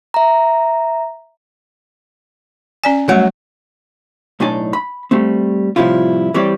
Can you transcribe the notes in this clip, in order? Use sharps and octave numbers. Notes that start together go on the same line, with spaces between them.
E5 A#5
C#4 D5 G#5
F#3 G3 A3
B1 A2 D4 D#4 G#5 A5
B5
G3 A3 C4
A2 C3 F3 G3 E4 F4
E3 G3 C4 G4 C#5 D5